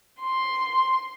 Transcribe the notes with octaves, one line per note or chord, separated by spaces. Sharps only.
C6